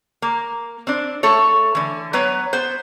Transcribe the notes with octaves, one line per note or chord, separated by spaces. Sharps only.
A#3
C4 D4
A3 A4 C#5
D3 E3
F#3 B3 B4 C#5
B3 C5